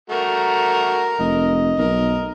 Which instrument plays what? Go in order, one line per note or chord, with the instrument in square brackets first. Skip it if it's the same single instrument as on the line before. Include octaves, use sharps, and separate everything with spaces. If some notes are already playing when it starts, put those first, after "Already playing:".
[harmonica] A3 F#4 A#5 [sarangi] A#4
[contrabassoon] F1 [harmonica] D#5
[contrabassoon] B1 [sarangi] A#4